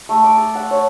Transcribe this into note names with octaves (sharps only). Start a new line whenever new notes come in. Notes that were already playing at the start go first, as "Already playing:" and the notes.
A3
D6
A4
F#5
C#5